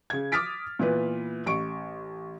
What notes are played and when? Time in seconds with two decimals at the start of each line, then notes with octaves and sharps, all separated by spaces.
0.10 C#3 G#6
0.32 D6 D#6 F6 A6 B6 D7
0.79 A#2 E3 B3 B4
1.46 A1 C#6 D7